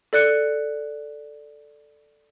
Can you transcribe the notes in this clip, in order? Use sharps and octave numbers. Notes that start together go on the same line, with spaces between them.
A4 D5 F#6 C#7